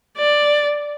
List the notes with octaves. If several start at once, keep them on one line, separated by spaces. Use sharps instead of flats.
D5